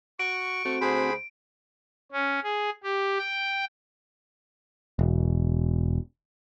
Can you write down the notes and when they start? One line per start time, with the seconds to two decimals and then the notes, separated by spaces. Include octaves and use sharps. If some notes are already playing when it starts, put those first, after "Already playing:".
0.19 F#4 C#6 D7
0.65 A3 C4 F#4
0.81 D2 G#4 C5 B5
2.12 C#4
2.43 G#4
2.83 G4
3.18 G5
4.99 E1